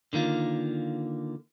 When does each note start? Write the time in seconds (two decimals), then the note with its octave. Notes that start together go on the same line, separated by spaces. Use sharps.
0.13 D3 D#3 A#3 F4